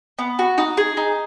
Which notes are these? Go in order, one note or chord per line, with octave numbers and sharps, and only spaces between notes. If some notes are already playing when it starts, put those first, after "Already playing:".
B3
F#4
D#4
G#4
D#4